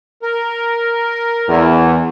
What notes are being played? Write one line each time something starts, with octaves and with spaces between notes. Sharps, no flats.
A#4
E2